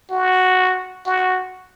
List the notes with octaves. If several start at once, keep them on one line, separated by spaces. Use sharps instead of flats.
F#4
F#4